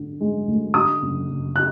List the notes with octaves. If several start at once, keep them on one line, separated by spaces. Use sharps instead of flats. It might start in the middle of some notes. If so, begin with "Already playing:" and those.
Already playing: D3
G#3
D2
D3 D#6
F#1
F#1
F#6